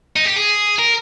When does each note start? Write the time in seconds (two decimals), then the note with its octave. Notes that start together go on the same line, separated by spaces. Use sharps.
0.17 D#4
0.26 G4
0.36 G#4
0.79 A#4